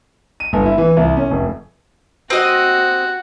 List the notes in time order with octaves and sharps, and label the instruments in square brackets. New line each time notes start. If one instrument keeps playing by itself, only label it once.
[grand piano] D#7
G1
E4
E3
C2
C#4
F1
[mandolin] C4 D#5 [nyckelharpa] F#4